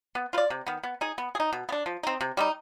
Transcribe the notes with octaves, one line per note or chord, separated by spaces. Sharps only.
B3
F4 B4 D5
C3
D#3 B3
B3
D#4 G#4
B3
G#4
D#4
B2
B3
D4
F3
C4 D#4
C3
G3 C4 D#4